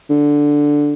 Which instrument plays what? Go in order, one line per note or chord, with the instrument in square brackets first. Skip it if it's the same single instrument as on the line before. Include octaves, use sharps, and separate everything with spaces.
[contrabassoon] D3